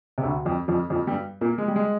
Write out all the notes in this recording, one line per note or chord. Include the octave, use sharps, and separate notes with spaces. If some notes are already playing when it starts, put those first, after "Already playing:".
C3
D2 D3
F2 F3
F2 F3
F2 F3
G2 G3
A#2 A#3
G#3
G3
G#3